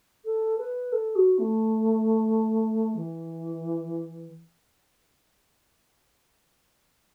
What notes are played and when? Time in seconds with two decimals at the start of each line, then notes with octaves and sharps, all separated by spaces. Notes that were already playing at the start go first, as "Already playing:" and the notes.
0.25 A4
0.58 B4
0.92 A4
1.15 F#4
1.38 A3
2.96 E3